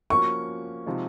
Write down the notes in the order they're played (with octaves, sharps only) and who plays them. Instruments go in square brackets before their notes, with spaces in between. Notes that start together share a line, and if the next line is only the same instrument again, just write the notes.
[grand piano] F3 A#3 C#4 F#4 [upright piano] C#6
[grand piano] C3 F3 G#3 D#4